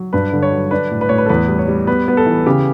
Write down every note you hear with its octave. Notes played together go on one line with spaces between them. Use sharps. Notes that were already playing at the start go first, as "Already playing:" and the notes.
Already playing: F#3
G2 B4
D3
C#5
F#3
D4 B4
A2
B4
A2 C#5
B4
A4
E2 B4
G3
C#5
G3
B3 B4
B3 B4
A4
E3
C#3 G4